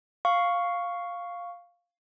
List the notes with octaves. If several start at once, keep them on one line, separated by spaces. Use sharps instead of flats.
F5 C#6